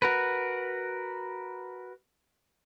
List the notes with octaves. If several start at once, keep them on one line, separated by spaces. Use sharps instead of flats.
F#4 A#4 B4